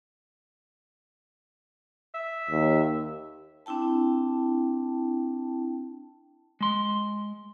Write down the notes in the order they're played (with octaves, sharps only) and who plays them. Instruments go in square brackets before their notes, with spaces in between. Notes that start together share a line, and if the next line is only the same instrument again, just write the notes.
[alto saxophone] E5
[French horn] D#2
[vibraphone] C4 D4 E4 G5 A5
[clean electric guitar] G#3 C6